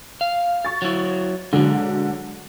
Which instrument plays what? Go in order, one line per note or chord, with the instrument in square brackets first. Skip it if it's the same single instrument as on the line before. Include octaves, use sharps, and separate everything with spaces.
[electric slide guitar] F5
[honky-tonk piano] C#6 A6
[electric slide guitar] F#3 E4
[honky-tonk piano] D3 F#3 [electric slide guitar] G#3 D4